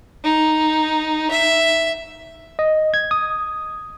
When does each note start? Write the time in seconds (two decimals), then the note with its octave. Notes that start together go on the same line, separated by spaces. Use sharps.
0.24 D#4
1.31 E5
2.59 D#5
2.94 G#6
3.11 D#6